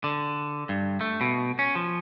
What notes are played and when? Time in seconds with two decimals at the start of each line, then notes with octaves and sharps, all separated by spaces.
0.04 D3
0.69 G2
1.01 A3
1.21 B2
1.59 C#4
1.75 F3